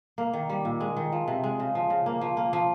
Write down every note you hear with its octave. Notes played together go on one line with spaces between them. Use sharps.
A#3
D#3
G3
A#2
G#3
D#3
F3
C3
G#3
C#3
F3
C#3
A#3
F3
A#3
F3